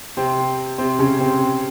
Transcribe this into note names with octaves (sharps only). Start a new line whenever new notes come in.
C3 C4
C3 C4
C#3 C#4
C3 C4